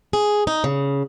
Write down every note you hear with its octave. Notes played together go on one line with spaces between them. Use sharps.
G#4
D#4
C#3